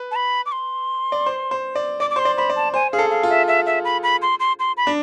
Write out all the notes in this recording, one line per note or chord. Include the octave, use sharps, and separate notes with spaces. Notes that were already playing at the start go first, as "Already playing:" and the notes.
Already playing: B4
A5
B5
D6
C6
D5
C5
C5
D5
D5 D6
D6
C5 C6
D5
C5 B5
D5
A5
C5 G#5
G#4 F5
A4
F5
F4
E5
E5
E5
B5
B5
C6
C6
C6
B5
D4